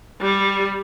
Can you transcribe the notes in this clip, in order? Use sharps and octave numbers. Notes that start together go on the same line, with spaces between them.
G3